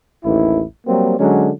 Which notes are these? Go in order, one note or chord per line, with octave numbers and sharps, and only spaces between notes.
A1 D#2 D#3 E4
F#3 G3 A#3 C4
D3 F#3 G#3 C#4